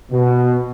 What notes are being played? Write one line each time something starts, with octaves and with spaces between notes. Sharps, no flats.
B2